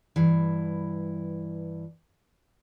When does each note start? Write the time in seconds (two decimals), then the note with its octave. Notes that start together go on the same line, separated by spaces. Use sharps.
0.16 G2 E3